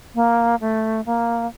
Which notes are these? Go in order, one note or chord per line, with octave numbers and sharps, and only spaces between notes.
A#3
A3
A#3